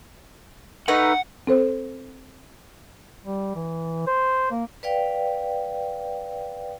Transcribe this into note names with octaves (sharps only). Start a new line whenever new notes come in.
A3 D#4 B4 F#5
C4 A4 C5
G3
E3
C5
A#3
B4 D5 F5 G5